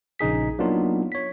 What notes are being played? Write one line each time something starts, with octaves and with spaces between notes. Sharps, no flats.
A#1 C#3 D#4 G#4 B6
F#3 A#3 B3 D4 D#4 F4
C#5 B6